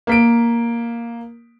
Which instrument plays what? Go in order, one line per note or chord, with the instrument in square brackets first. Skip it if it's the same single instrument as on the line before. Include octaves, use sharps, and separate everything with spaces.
[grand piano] A#3 B6 D7